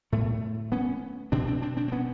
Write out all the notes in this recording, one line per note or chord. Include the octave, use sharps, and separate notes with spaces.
A2 A3 B3
B3 C#4
B2 C4 D4
C4 D4
C4 D4
C4 D4
C4
B3 C#4